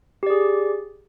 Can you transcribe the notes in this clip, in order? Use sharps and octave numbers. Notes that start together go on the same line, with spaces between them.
G4 G#4 D5